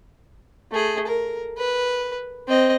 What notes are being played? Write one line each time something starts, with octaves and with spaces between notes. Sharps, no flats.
A3 G#4
A#4
B4
C4 D#5